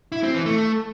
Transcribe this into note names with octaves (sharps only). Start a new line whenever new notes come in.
E4
C4
E3
A3